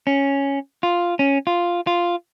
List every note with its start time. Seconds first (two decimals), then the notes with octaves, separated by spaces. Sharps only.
0.07 C#4
0.83 F4
1.19 C#4
1.47 F4
1.87 F4